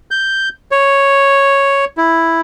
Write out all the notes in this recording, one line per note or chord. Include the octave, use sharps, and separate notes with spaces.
G6
C#5
E4